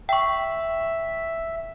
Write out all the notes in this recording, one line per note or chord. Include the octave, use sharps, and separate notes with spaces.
E5 G5 C#6